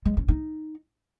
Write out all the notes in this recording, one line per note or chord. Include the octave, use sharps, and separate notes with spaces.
G#3
C#4
D#4